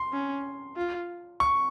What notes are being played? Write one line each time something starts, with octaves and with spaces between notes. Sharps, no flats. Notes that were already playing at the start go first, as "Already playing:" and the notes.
Already playing: C6
C#4
F4
C#6